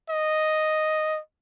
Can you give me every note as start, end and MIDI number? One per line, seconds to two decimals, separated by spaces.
0.10 1.19 75